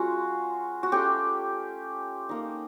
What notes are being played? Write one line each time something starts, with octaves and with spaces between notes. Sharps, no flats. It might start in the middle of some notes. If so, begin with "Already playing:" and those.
Already playing: G#3 C#4 F4 F#4
F#4
A3 C#4 F4 G4
A#3 D#4